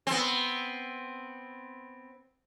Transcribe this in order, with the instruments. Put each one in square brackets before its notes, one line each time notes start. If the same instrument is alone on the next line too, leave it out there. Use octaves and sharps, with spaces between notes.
[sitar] B3 C4